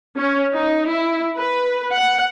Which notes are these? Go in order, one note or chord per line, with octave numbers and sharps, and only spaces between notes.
C#4
D#4
E4
B4
F#5